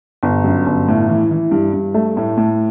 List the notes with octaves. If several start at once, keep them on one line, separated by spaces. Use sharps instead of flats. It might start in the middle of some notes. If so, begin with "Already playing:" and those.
G1
F#2
G1
A2
E3
E3
G2
G2
A3
A2
A2